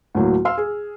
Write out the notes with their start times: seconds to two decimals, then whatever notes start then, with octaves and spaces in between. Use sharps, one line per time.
0.15 D2 A2 F#3 A#3
0.45 F5 C6 E6 F6
0.58 G#4